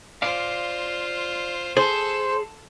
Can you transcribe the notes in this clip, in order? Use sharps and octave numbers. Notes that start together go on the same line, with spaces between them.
F4 C5 D5 F5
G#4 A4 C5 A5